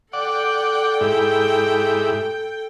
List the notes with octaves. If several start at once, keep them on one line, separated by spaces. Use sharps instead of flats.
A4 D5 F#5 G5
G#2 E4 G4